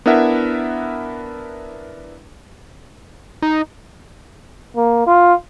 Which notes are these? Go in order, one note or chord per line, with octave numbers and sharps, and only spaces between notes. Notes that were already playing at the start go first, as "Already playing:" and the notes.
B3 D4 E4 A#4 E5 F#5
D#4
A#3
F4